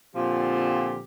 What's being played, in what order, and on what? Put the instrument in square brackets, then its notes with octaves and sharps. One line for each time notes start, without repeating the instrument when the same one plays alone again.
[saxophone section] A#2 D3 F3 C4 G4